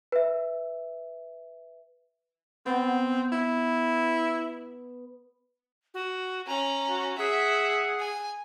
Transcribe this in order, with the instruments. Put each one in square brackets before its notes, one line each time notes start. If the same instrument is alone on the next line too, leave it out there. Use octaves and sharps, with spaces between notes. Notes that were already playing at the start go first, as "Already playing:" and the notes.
[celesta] B4 E5
[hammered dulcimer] B3 [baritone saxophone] C4
[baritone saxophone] E4
[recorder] F#4
[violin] C#4 [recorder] A#5
[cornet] F#4
[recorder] G#4 [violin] E5 [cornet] F#5
[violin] G#5